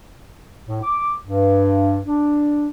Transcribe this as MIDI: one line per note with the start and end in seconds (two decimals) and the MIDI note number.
0.68 0.80 45
0.83 1.13 86
1.27 1.99 43
2.07 2.68 62